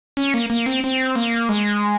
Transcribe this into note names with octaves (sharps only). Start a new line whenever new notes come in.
C#4
A#3
A#3
C4
C4
A#3
G#3